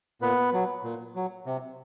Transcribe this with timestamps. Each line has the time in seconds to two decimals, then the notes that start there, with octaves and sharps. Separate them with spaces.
0.22 A#2 B3 B4
0.53 F#3
0.84 A#2
1.15 F#3
1.46 C3